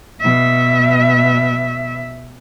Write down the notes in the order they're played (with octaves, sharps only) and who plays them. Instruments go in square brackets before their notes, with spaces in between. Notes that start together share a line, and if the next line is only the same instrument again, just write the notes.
[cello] B2 E5